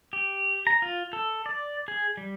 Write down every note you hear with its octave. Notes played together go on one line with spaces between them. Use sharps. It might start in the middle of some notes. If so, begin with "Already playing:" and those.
G4
A#5
F4
A4
D5
G#4
G3